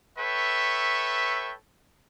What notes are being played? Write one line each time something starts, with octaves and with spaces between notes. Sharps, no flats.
A4 B4 C#5 E5 G5 C#6